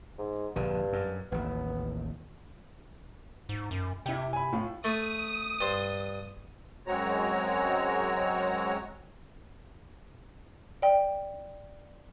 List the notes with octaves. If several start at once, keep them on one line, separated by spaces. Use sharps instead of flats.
G#2
A#1 G2 D3
F#2
A1 D#2 B3
G#2
F#2
C3 E4 G5
G#5 B5
A2 F4
A3 D#6
G2 C5
F#2 G#3 C4 F#4 C#5 A#5
D5 G5